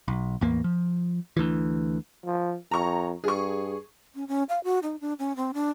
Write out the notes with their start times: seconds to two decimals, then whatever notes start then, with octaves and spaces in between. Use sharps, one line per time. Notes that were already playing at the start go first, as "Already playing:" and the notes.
0.08 B1
0.41 A1 E2 A#3
0.64 F3
1.37 D2 E3
2.25 F3
2.71 F2 A#5 C#6
3.24 G2 G#4 C#6
4.15 C#4
4.28 C#4
4.49 F5
4.64 F#4
4.83 D#4
5.01 D4
5.19 C#4
5.36 C4
5.54 D4